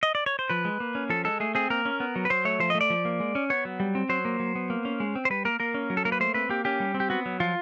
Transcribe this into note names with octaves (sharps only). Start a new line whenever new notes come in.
D#5
D5
C#5
C5
F3 B4
G#3
A#3
C#4
F3 A4
G#3 A4
A3 G#4
C4 G#4
A#3 A#4
C#4
B3
F#3
B4
F#3 C5
A3 C#5
F3 C5
D#5
A3
D5
F3
A#3
G#3
C#4
B3 C#5
F#3
G3
C4
F#3 C5
A#3
F#3
B3
A#3
C#4
G#3
C4
C5
G3 B4
A#3 A#4
A#3 A#4
C#4
F#3
A4
A#3 A#4
B4
A3 C5
C4 B4
A#3 G4
C#4 G4
G3
C4
G4
B3 F#4
F#3
F3 F4